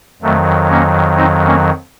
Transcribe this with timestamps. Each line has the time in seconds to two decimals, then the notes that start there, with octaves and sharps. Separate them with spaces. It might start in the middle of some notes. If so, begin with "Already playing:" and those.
0.22 F2 D#3 F#3 A3
0.69 A#3 C#4
1.16 C4 D#4
1.46 A#3 C#4